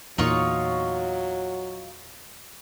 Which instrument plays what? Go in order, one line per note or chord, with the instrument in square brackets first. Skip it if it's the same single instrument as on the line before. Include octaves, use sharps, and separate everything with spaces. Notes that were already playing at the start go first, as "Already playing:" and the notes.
[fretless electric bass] E2 A#2 [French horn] F#3 [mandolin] D#4 F4 C#5